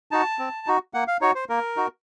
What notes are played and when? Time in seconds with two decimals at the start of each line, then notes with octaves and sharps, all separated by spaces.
0.11 D#4 F#4 A5
0.39 C4
0.67 D#4 F#4
0.94 A#3 F#5
1.08 F5
1.21 D#4 F#4 C#5
1.35 C5
1.49 A#3 A#4
1.76 D#4 F#4